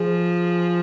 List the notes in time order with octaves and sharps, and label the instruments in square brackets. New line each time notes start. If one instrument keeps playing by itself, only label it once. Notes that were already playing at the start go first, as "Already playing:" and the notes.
Already playing: [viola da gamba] F3 [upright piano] G#4